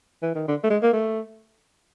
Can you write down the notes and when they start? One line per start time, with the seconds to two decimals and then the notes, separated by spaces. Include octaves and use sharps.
0.22 E3
0.35 D#3
0.48 D3
0.64 A3
0.70 G#3
0.83 A#3
0.93 A3